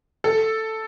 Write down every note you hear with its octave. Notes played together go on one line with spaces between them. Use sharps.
A4